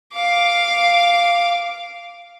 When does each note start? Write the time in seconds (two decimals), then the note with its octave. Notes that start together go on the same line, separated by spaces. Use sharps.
0.14 F5 D6